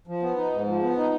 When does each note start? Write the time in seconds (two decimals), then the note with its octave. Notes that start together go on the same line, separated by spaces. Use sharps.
0.07 F3
0.23 B3
0.37 D#4
0.52 G#2
0.68 F3
0.83 B3
0.97 D#4